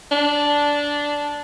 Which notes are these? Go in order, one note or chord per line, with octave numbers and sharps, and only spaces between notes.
D4